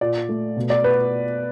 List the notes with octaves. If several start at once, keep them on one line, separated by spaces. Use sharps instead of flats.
A#2 D5
A3
B2
D5
B3 B4